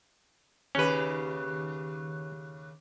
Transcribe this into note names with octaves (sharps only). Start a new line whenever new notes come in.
D#2 C#3 C#4 G4 B4